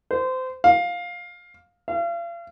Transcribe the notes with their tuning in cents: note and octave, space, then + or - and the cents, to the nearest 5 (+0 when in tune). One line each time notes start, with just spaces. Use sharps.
C5 -25
F5 +10
F5 -40